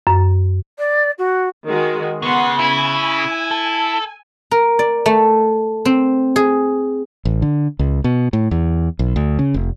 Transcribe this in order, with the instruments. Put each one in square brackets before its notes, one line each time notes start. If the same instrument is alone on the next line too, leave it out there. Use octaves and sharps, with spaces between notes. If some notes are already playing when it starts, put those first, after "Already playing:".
[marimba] F#2
[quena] D5
F#4
[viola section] D#3 G#3 F#4
[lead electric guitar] C#3 [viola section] B3 F#5 C6
[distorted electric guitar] E4 [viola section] G#5
[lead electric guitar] A4
[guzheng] A#4
D5
A3
C4
G#4
[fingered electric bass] A1
D3
C#2
B2
A2
E2
B1
D2
C#3
F1